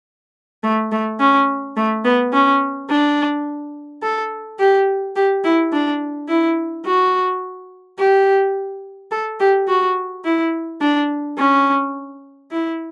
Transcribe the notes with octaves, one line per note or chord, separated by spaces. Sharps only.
A3
A3
C#4
A3
B3
C#4
D4
A4
G4
G4
E4
D4
E4
F#4
G4
A4
G4
F#4
E4
D4
C#4
E4